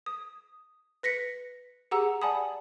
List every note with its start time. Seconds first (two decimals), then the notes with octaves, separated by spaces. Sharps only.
0.06 D#6
1.03 B4 A#6 B6 C#7
1.91 G4 G#4 F#5 A#5 E6
2.22 D5 F#5 G#5 A5 B5 D#6